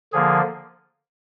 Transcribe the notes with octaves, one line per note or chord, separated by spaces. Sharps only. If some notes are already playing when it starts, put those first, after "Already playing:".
D3 F3 A#3 G#4